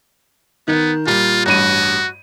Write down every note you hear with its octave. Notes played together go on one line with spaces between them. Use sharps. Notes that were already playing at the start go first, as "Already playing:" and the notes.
D#3 B3
A#2 G3 F4
A1 G2 F#4 D#7